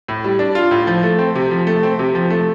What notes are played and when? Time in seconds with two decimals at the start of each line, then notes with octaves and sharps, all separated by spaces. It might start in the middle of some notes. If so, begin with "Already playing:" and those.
0.08 A2
0.24 G3
0.39 D4
0.55 F4
0.71 A2
0.87 F3
1.03 A3
1.19 C4
1.35 C3
1.51 F3
1.67 A3
1.83 C4
1.99 C3
2.15 F3
2.30 A3